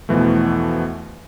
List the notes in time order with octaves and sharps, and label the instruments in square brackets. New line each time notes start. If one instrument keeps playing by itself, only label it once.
[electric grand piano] E2 B2 E3 F3 A3